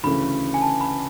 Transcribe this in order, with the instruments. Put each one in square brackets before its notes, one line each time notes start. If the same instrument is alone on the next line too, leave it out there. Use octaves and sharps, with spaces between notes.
[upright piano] D2 C#3 E3 [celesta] B5
[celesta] G#5
A5
B5